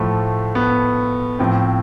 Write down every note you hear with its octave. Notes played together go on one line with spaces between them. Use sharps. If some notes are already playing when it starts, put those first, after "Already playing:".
Already playing: A2 F3 A3
B3
A2 F3 C4